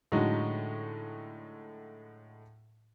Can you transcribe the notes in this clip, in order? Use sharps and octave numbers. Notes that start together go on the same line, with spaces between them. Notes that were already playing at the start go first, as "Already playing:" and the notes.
A2 D3 F#3 G#3 D#4